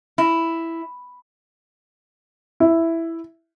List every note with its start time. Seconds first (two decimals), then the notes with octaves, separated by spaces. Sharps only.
0.18 E4
2.60 E4